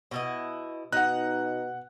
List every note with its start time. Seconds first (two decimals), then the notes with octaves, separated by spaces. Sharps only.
0.11 B2 E4 D#5
0.92 B2 D#4 F#5 F#6